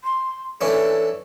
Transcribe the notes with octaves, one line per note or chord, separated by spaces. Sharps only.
C6
E3 C#4 D4 A4